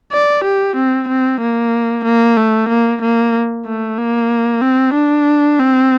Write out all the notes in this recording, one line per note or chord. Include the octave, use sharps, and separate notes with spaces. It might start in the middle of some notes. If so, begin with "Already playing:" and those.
D5
G4
C4
C4
A#3
A#3
A3
A#3
A#3
A3
A#3
C4
D4
C4